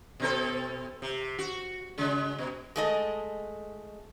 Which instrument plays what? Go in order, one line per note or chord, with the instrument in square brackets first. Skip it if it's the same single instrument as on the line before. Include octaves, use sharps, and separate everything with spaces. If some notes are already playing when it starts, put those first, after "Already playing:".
[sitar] B2 C4 A4
C3
F#4
C#3 G#3
B2
[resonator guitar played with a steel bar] G#3 A3 D#5